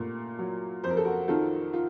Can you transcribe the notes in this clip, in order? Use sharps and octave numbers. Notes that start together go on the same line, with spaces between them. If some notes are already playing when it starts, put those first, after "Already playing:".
Already playing: A#2 A3
F#3
F2 C5
A#4
A4
F#4 A#4
D#3 F4 A4
F4